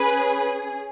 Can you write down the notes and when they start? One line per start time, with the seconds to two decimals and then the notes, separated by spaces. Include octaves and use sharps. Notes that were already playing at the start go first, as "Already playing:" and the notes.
Already playing: C#4 G#4 B4